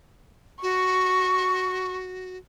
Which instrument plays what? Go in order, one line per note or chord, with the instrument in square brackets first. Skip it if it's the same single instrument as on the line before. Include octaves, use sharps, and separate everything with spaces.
[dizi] F#4 [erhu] C#6